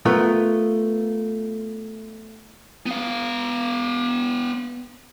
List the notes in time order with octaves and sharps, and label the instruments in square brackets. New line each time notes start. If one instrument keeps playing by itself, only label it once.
[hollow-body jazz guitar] A3 B3 F4 A#4
[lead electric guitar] B3 F5